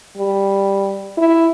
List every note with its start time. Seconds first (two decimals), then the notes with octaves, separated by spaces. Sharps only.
0.17 G3
1.17 E4